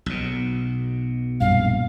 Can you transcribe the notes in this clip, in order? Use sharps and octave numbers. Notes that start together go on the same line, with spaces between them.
B1 B2
A#1 F#2 G3 F5